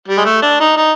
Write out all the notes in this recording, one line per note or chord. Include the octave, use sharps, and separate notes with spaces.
G3
G#3
A3
D4
D#4
D#4